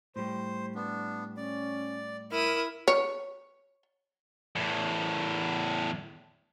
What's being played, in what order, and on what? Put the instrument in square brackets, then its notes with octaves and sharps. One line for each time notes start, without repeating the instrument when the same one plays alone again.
[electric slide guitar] A2 G3 [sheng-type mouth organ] C5
[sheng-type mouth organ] B3 D4
[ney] C#4 [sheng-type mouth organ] D5
[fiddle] E4 D#6 [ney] A#4 [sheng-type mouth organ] F6
[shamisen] C#5
[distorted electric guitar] E2 A2